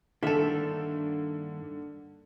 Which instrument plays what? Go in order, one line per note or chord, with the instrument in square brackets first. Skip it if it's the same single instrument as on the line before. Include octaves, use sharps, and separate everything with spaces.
[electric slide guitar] G2 D#3 A#3 [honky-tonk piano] D3 E7 [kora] A4 E5